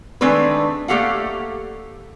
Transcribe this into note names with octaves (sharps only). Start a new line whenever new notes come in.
D#3 G#3 A3 C4 D4 B4
A3 A#3 G4 A4 F5 F#5